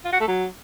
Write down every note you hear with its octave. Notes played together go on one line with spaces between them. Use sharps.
F4
F#4
A3
F#3